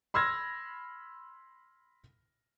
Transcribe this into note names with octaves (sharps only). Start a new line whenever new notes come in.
B5 C6 E6 F6 G#6 A#6